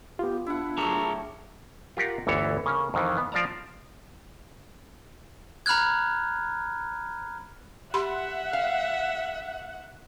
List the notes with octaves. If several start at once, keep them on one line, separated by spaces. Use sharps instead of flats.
B3 F4 G4
D4 E4 F#5
F#3 A3 G4 G#4 A5 A#5
F4 G4 A#4 F#5
G1 D2 E3 A4 C#5
C#3 A#3 C#4
F2 D#3 E3
B3
F3 F4 D5 A5 A#5
A#5 B5 F6 F#6 G#6
G4 E5 F#5 B5 C6
F5